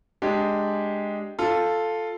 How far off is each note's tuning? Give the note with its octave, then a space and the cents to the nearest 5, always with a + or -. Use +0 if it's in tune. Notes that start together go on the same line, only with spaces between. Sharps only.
G#3 +0 D4 +0 G4 +0
F4 +0 A4 +0